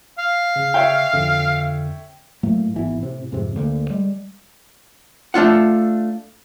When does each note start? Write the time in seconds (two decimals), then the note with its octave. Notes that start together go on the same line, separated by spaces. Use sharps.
0.19 F5
0.56 C#3
0.74 C#5 E5 G5
1.13 F2 D3
2.43 A2 F#3 A3 A#3
2.74 G#1 E3 B3
2.98 A2 C3
3.32 F2 G#2 C3
3.56 D2 D3 A#3
3.90 G3 G#3
5.34 A3 D4 F4 F#5